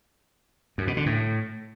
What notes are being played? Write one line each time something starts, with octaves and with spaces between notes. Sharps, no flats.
F#2
B2
D3
A2